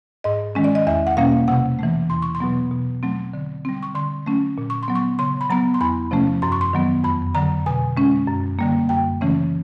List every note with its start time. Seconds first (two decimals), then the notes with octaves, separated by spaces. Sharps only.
0.24 G#2 D#5
0.55 D#3 G#3 C#4
0.64 D5
0.75 D#5
0.87 E2 E5
1.07 F#5
1.17 B2 G3 A#3 C#4 F5
1.48 C3 F#5
1.79 E3 A3
2.10 E2 C6
2.22 C#6
2.35 C6
2.40 B2 F#3 B3
2.72 B2
3.03 F#3 A3 C4
3.34 D3
3.65 G3 C4
3.83 C#6
3.95 D3 C6
4.26 F#3 A3 C#4
4.58 A#2
4.70 C#6
4.83 C6
4.88 F#3 B3
4.95 C#6
5.19 C#3 C6
5.41 B5
5.50 F#3 B3 A#5
5.74 C6
5.81 E2 B5
6.11 C3 F3 A3 C#4
6.42 F#2 C6
6.52 C#6
6.61 C6
6.73 D#3 F#3 B3
7.04 F2 B5
7.35 D3 F#3 A#5
7.66 B2 G#5
7.97 G#3 C#4
8.27 F#2
8.59 D3 G3 A#3
8.89 F#2 G5
9.21 C#3 E3 A3 C#4